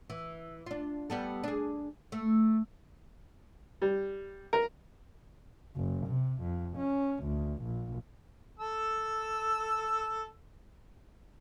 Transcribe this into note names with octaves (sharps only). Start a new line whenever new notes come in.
E3
D4 F4
G3 B3 A4
D4 G#4
A3
G3
A#4
F#1
C3
F2
C#4
D2
A#1
A4 E6